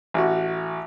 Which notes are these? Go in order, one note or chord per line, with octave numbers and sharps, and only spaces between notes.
A1 F#4